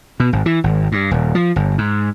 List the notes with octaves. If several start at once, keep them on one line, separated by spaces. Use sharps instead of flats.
B2
G#1
E3
G#1
G2
D#1
F3
G1
G#2